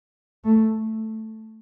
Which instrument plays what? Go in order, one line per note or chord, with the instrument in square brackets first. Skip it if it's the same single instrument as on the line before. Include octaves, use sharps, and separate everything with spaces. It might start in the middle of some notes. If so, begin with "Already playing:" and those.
[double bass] A3